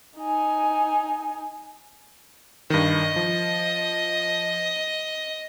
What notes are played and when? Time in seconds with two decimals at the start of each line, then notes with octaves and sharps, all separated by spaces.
0.18 D#4 G#5
2.70 G2 D#3 D#5
3.16 F3